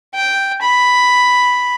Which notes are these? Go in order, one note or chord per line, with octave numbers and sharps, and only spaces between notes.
G5
B5